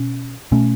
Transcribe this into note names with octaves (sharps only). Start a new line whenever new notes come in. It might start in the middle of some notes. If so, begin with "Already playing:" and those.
Already playing: B2 C#4
B2 A3 C#4